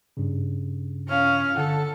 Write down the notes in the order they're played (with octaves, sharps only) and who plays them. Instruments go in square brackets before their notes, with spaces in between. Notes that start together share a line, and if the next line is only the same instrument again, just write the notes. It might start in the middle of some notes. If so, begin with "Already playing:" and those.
[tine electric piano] G2 C#3
[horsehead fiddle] C#4 F5
[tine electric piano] D3 F#5 [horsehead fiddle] A4